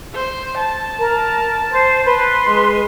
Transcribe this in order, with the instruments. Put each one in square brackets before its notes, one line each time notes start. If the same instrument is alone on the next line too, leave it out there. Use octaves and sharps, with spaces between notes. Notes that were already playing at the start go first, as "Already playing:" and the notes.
[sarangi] C5
A5
[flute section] A#4
C5
B4 C6
[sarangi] G#3